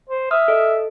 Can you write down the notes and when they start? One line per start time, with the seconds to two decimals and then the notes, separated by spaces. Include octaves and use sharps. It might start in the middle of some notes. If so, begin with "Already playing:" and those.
0.09 C5
0.31 E5 D#6 F6
0.48 A4 D#5